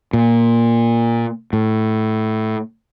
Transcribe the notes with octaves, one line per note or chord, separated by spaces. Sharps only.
A#2
A2